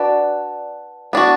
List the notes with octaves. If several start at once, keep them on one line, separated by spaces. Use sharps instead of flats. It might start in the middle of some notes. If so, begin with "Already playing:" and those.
Already playing: D4 F#4 B4 D5
B3 D4 F#4